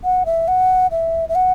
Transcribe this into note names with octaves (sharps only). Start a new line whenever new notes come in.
F#5
E5
F#5
E5
E5
F#5